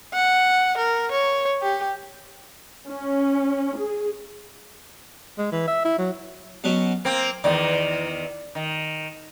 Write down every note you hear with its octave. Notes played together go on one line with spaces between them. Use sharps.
F#5
A#4
C#5
G4
C#4
G#4
G#3
E3
E5
E4
F#3
B2 F#3 C#4
A#3 C4 D6
E2 D#3 D5
D#3